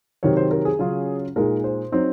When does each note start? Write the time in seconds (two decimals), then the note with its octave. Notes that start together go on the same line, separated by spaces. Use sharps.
0.23 C3 D#3 F#3 C#5
0.37 C5
0.51 A#4
0.65 G#4
0.79 C#3 F#3 C#4 F4
1.36 A#2 G#3 D#4 A#4
1.64 C5
1.92 F#3 C4 D#4